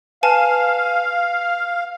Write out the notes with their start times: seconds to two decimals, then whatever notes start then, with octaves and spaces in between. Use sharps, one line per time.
0.23 B4 F5 G#5 A5